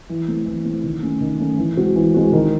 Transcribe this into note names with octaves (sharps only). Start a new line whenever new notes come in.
E3
A3 C4
E3
A3 C4
D#3
A3 C#4
D#3
A3 C#4
E3
G#3 C4 F#4
E3
G#3 C4 F#4
D#3